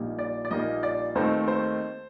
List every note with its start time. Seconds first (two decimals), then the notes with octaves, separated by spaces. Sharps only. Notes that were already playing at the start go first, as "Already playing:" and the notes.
Already playing: A#1 A#2 G3 A#3 D#4
0.19 D5
0.45 D5
0.51 A#1 A#2 G3 A#3 D#4 D#5
0.83 D5
1.15 D#2 D#3 A3 C4 D#4 C5
1.48 C5